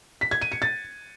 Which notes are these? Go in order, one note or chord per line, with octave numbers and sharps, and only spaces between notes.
B6
G#6
D#7
C#7
A6